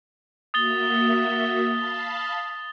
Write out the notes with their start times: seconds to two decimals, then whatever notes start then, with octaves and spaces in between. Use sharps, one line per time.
0.54 A#3 F#4 E5 D#6 A6 G7
1.66 F5 A5 B5